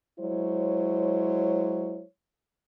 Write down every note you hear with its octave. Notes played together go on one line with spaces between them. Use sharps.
F#3 G#3 E4 C5 C#5